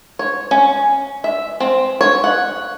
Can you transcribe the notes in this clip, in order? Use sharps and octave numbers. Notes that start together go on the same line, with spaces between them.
C#5
C#4
E5
C4
C#5
F#5